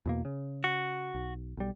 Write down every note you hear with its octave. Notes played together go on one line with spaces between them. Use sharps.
E2 B2 A#3
C#3
F#4
B1
B1 G3